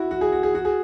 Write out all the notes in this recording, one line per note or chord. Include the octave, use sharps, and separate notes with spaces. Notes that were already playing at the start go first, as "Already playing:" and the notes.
Already playing: E4 F#4
F#4
G#4
F#4
G#4
F#4
G#4